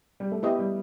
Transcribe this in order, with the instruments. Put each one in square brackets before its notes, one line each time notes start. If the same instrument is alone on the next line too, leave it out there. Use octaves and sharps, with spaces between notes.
[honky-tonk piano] G3
A3
[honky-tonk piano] B3 [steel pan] E4 G4 D#5
[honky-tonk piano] G3